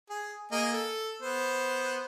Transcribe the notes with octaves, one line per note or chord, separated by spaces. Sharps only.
G#4
A#3 G#4 D#5
A4
B3 C5